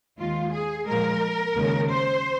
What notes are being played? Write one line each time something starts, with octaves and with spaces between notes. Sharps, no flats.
D#2 D#3 G#3 F4
G#4
A#2 F3 G#3 A#4
D#2 C#3 G#3
C5